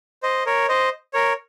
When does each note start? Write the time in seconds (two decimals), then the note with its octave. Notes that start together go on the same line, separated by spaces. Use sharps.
0.23 C5 D#5
0.46 A#4 C#5
0.69 C5 D#5
1.13 A#4 C#5